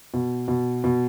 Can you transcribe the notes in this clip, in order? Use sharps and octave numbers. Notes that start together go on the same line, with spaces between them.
B2
B2
B2